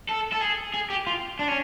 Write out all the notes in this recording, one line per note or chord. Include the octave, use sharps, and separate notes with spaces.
A4
A4
G#4
G#4
G4
F4
D4
C#4